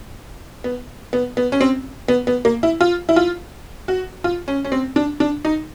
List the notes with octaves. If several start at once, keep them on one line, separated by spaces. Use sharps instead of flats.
B3
B3
B3
C#4
C4
B3
B3
A#3
E4
F4
E4
F4
F#4
F4
C#4
C#4
C4
D4
D4
D#4